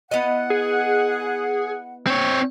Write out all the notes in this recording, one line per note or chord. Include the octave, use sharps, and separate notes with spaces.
B3 E4 D#5 F#5
G#4
C4 C#5